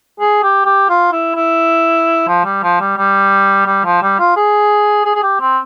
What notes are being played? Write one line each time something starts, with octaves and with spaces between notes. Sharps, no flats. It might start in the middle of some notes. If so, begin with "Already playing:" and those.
G#4
G4
G4
F4
E4
E4
F3
G3
F3
G3
G3
G3
F3
G3
F4
G#4
G#4
G#4
G4
C4